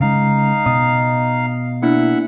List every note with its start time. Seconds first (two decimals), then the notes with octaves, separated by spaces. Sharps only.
0.01 C#3 G#3 D#4 F5
0.66 B2 D#5 D#6
1.82 A#3 D4 E4 E5 F#5